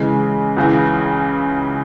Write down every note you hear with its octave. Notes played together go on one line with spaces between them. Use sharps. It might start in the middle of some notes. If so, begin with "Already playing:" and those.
Already playing: C#3 E3 G#3
C#2 C#3 E3